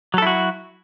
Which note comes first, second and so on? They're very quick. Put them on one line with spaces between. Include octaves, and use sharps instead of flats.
F#3 A4 E4 F#4